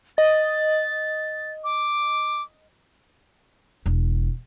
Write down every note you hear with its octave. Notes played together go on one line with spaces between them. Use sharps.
D#5 A6
D6
E1